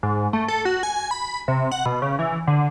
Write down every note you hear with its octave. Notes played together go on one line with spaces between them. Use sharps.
G#2
A3
A4
F#4
G#5
B5
C3
F#5
B2
C#3
E3
D3